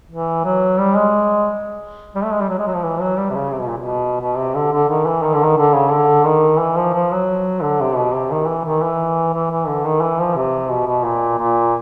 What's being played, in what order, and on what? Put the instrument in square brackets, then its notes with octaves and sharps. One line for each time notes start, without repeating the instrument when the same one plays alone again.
[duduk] E3
F#3
G3
G#3
G3
A3
G#3
G3
F#3
G#3
F#3
F3
E3
F#3
G3
C3
C#3
C3
B2
A#2
B2
B2
C3
D3
D3
D#3
E3
D#3
D3
D#3
D3
C#3
D3
D#3
E3
F3
F3
F#3
D3
C3
B2
C3
D#3
E3
D#3
E3
E3
E3
D3
D#3
E3
F3
C3
B2
B2
A#2
A#2